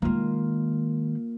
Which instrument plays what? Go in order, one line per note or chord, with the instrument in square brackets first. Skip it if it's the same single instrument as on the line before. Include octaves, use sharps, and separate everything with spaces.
[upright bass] D#3 G#3 [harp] A#3 F4